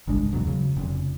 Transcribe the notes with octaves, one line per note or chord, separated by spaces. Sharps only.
G1 C2 G#3 D4
D#1 E2 B2 F#3
C#3 F#3
F1 C#3